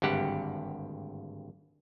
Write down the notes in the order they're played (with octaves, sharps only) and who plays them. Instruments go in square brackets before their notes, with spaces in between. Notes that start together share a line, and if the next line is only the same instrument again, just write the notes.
[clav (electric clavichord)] G#1 D2 G2 G4 F#5